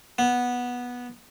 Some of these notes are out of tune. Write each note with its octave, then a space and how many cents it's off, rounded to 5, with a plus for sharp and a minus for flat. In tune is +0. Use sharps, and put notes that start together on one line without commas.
B3 -10